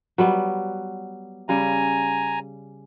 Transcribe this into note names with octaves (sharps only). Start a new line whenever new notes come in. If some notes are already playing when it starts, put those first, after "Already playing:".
F#3 G3 B3
C#3 G3 G#5 A#5